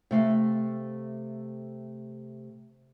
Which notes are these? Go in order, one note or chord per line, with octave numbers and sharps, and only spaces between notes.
C3 A3 F5